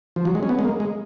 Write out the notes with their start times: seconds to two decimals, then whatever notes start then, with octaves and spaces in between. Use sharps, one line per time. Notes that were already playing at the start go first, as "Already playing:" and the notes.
0.16 F3
0.25 F#3
0.35 G#3
0.43 C#4
0.49 B3
0.59 G#3
0.65 A#3
0.80 G#3